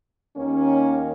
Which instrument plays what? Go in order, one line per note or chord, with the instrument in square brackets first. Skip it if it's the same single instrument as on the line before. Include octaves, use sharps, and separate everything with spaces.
[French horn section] D#2 D#3 A#3 C#4